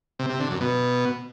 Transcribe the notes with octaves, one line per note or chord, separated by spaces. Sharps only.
C3
C3
D3
F#2
B2